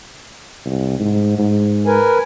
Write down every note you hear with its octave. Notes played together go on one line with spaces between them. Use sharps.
C2
G#2
G#2
A#4 B4 G#5